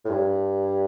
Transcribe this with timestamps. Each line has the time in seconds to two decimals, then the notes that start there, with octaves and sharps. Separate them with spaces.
0.05 A2
0.10 G2